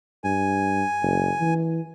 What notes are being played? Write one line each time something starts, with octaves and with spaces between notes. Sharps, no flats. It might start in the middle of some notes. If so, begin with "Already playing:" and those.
G2 G#5
F#1
E3